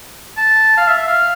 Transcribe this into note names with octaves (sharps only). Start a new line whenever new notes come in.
A5
F5
E5
E5
F5